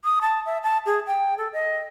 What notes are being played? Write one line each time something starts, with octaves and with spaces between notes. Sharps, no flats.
D#6
A5
E5
A5
G#4
G5
A4
D#5